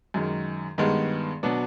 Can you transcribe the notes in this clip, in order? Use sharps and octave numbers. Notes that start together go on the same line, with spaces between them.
F#2 D#3 G#3
G2 D#3 G#3 B3
B2 F#3 B3 D4